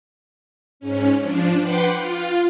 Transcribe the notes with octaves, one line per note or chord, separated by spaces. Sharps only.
G#2 C#4
F3 D4
B4 F#5 G5 C6 D6
F4